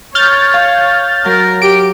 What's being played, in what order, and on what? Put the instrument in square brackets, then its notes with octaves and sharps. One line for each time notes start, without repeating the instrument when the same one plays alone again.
[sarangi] C#5 [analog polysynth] F6 G6 A6
[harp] F5 C#6
[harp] F#3 [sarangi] A#4
[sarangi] G4 [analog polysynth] D7